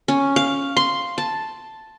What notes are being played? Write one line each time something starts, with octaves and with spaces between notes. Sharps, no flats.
C#4
F5
C6
A5